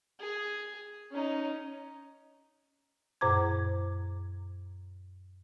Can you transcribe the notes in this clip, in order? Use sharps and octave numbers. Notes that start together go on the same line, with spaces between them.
G#4
C#4 D#4
F#2 A#2 C5 A#5 D6 G#6